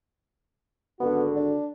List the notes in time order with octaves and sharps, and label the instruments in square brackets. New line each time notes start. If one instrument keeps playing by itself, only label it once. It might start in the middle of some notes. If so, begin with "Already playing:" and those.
[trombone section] G#1 D3 F#4 [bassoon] B3
[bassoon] D4